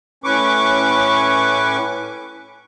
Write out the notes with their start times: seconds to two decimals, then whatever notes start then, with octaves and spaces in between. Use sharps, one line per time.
0.24 A2 C#4 B4 C#6 D6